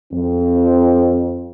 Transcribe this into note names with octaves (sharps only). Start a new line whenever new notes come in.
F2 C4